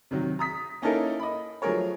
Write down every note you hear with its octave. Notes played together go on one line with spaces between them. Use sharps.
C3 D#3 F#3
A#5 D#6 B6
A#3 C#4 D#4 E4 A4 A#4
D#5 B5
F3 F#3 A3 G#4 A#4 C#5